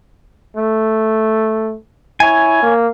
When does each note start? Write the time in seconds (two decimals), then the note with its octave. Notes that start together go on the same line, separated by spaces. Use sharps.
0.57 A3
2.20 E4 C#5 G#5
2.62 A#3